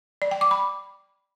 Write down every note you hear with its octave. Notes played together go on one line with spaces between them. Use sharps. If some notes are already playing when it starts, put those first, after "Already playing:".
D5
G5
D6
B5